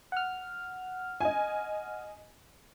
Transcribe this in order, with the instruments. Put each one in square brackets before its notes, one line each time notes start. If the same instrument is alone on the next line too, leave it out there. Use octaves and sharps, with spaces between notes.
[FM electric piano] F#5 F6
[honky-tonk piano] D#5 G#5